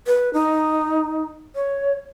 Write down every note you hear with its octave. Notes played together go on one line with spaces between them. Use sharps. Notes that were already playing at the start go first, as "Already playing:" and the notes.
B4
D#4
C#5